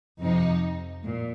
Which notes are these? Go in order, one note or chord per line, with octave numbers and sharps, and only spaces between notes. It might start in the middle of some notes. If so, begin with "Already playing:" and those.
F2 C3 F3 D#4
A#2